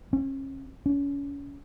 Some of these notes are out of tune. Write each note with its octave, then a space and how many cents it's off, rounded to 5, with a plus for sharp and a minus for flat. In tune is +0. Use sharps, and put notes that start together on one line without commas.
C#4 -35
C#4 +30